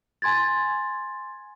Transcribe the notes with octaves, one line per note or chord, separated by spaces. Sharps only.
G#5 C6 G#6 A6